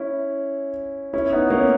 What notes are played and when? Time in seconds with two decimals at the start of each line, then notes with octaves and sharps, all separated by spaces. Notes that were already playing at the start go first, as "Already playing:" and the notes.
Already playing: C#4 E4
1.13 C#4 E4
1.32 B3 D#4
1.50 A#3 C#4